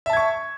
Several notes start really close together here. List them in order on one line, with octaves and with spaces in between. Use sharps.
E5 A5 G#6 C#6